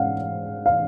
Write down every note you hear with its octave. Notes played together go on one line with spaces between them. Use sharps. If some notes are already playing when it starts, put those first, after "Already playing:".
Already playing: G#2 G#3 C#4 F5 F#5
F5